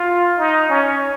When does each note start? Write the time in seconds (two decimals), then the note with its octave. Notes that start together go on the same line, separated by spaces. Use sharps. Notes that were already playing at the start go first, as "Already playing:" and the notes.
Already playing: F4
0.38 D#4
0.69 C#4